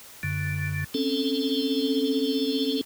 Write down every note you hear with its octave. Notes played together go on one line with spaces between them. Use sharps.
F#2 D3
C4 C#4 A4